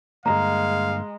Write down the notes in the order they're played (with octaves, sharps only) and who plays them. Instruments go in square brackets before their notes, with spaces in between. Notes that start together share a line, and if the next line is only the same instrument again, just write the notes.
[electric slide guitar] G2 D3 A#3 [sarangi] G#3 [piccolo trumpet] F5 [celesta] A#5